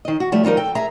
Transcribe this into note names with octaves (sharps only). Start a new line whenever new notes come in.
D#3 D#5
F#4
F3 G3 A3
D#3 F3 G3 D#4 A#4
A4 G5
G#4 E5 A#5